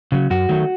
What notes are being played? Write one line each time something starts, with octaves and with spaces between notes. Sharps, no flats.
C#3 F#3
F#2 F#4
D#3 F#3 A3